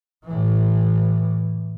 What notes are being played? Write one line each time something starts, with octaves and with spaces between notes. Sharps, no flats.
A2 E3